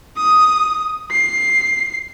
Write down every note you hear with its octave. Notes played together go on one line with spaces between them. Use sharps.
D#6
C7